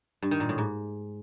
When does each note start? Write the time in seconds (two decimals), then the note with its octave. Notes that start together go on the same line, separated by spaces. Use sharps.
0.22 G2
0.31 D#3
0.40 A#2
0.49 A2
0.58 G#2